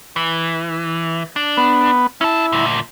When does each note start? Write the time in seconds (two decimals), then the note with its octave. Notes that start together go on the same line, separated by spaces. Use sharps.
0.16 E3
1.36 D4
1.57 B3
2.21 C#4 E4 A5
2.52 D2 A#2